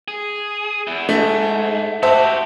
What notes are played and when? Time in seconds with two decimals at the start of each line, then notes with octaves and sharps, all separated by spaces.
0.08 G#4
0.87 E2 E4
1.09 G#2 A3
2.03 F#4 G4 C5 E5 A5